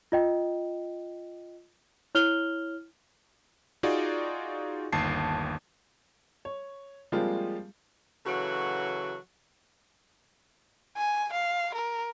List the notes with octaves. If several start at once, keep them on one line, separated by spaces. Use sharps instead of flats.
F4 D#5 G5
E4 C#5 F6 F7 G7
D#4 F4 F#4 G#4 D5
G1 D#2 A5 C7
C#5
F3 G3 G#3 A#3 C4 F4
C#3 E3 F#3 F#4 A4
G#5
F5
A#4